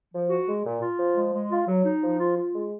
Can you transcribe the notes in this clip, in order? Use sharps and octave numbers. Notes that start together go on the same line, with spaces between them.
F3
F#4
G#3
A#2
F4
F3
G#3
G#3
F4
F#3
D#4
F3
F4
F4
G#3